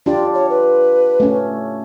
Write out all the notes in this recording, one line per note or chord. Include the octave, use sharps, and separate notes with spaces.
D4 F4 G4 D5
C#5
B4
A3 C#4